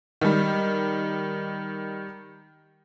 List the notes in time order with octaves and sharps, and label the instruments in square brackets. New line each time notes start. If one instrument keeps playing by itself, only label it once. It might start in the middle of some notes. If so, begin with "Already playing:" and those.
[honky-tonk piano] D#3 G3